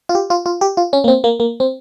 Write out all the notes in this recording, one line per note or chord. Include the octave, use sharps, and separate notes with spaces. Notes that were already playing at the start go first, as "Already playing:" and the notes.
F4
G4
F4
F4
G4
F4
C#4
A#3
C4
A#3
A#3
C4